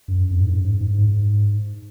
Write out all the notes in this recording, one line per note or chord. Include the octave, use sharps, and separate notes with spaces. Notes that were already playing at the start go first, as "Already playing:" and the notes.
F#2
F2
G#2
F#2
G#2
G#2
G#2